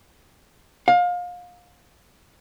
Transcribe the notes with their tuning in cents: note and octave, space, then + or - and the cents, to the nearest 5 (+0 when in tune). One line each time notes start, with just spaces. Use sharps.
F5 +30